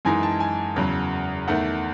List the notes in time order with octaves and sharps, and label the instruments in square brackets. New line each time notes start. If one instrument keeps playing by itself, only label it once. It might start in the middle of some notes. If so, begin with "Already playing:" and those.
[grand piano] F#2 E3 G#3 D#4 G#5
A5
G#5
E2 C#3 F#3
E2 D#3 A3 F#5